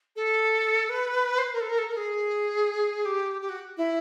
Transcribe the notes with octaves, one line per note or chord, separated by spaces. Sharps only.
A4
B4
C5
B4
A#4
A4
A#4
A4
A#4
G#4
G4
G4
F#4
E4